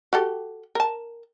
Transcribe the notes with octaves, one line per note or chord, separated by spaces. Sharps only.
F#4 G4 A4
A#4 A5